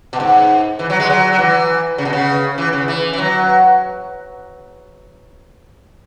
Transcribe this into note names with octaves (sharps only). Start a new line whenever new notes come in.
B2
G#2
E3
F#3
G#3
F#3
F#3
E3
C#3
B2
C#3
E3
C#3
E3
E3
F#3